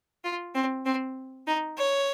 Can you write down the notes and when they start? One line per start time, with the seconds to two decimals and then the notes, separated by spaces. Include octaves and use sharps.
0.24 F4
0.55 C4
0.85 C4
1.47 D#4
1.78 C#5